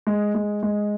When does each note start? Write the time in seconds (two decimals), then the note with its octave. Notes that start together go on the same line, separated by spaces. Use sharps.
0.07 G#3
0.35 G#3
0.63 G#3